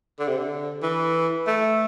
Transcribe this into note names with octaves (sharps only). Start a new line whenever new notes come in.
D3
C3
D3
E3
A3